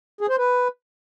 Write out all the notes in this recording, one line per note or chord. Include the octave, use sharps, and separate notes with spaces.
G#4
C5
B4